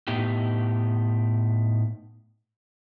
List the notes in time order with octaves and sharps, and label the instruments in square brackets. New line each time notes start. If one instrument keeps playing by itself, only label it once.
[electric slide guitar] A2 B3 D#4 G4